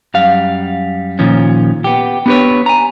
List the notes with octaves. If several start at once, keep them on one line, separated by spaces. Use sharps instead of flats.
F#2 G3 F5
A#2 D#3 F3 C#4
B3 G4
B3 D4 G4 A#4 B4 C#5
G#5 A#5